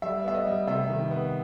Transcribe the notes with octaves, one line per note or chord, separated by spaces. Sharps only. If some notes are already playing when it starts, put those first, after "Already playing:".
G3 E5
B3 E5
D#5
G3
C3 E5
D#3
B3